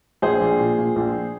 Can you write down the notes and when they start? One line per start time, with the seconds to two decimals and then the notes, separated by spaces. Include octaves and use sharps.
0.22 A#1 G#4 C5
0.41 A#1
0.60 A#2
0.78 A#2
0.96 A#1